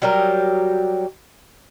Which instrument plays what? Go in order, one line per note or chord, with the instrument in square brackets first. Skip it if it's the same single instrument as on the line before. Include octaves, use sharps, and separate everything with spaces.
[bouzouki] F#3 G3 G4 A#4